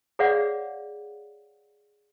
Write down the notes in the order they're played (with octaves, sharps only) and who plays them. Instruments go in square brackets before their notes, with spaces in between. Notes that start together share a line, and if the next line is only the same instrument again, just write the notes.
[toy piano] G#4 B4 C#5 D5 F5 F#5